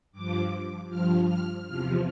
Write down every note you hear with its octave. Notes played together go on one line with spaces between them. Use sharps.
G2 F3 D6
G2 F3 F6
F6
E2 C3 F3 F6